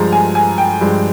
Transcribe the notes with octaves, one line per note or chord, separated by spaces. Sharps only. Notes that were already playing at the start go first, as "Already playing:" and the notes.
Already playing: G2 F3 G#3 A#5
G#5
G#5
G5
G2 F3 G#3